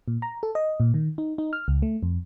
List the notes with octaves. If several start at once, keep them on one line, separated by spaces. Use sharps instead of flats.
A#2
A#5
A4
D#5
A#2
D#3
D#4
D#4
F6
C#2
A3
F2